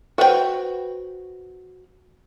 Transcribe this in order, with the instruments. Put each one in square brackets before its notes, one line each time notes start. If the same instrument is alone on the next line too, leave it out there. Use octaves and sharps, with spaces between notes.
[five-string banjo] F#4 B4 C5 D#5 G5